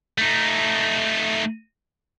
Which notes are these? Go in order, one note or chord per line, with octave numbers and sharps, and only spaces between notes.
A3 D#4